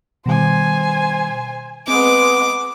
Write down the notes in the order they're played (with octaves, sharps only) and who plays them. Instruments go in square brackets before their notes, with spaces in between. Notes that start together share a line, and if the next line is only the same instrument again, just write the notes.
[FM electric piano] B2 D#3 G3 [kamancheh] C5 G#5
[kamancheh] G#3 B3 [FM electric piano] C4 [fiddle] D6